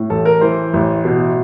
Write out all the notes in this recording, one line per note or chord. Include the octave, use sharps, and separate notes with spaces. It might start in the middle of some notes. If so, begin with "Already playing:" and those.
Already playing: A2
A1 A4
A#4
E3 C5
A1
B2